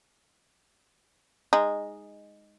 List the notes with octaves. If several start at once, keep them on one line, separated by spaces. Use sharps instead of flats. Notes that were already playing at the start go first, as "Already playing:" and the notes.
G#3 D#4